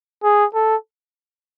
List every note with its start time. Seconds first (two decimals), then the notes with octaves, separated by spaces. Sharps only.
0.24 G#4
0.54 A4